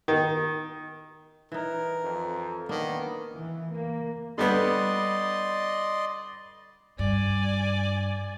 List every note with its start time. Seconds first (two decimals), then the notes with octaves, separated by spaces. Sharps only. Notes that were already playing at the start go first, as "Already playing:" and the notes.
0.08 D#3
1.52 E3 D#4 A#4
2.04 F2
2.69 D#3 A#3 B3 D4
3.35 E3
3.72 A#3
4.38 D3 G3 B3 D5 D#5 C6
6.99 G2 D5 G#5